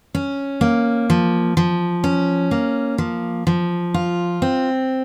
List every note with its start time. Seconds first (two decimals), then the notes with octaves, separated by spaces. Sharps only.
0.15 C#4
0.61 A#3
1.10 F3
1.57 F3
2.04 C#4
2.51 A#3
2.98 F3
3.47 F3
3.94 F4
4.42 C4